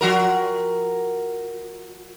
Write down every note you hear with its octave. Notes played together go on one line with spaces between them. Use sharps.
F3 F#4 A#4